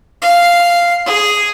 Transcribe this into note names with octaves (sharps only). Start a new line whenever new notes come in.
F5
G#4